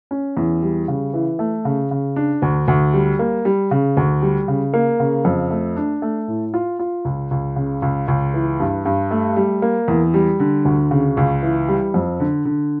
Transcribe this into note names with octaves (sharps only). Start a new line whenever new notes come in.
C#4
E2
G3
C#3
E3
A3
C#3
C#3
D4
D2
D2
G3
A#3
G3
C#3
D2
G3
C#3
A#3
C#3
F2
A3
D4
A3
A2
F4
F4
C#2
C#2
C#3
C#2
C#2
E3
G2
G2
A3
G3
A#3
E2
G3
D3
D2
C#3
C#2
E3
G3
F2
D3
D3